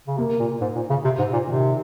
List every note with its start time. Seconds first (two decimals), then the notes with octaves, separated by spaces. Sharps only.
0.07 C#3
0.17 C3 A#3
0.39 A#2
0.61 G#2
0.75 A#2
0.90 C#3
1.04 C3
1.19 G#2
1.33 A#2
1.47 C3 D#3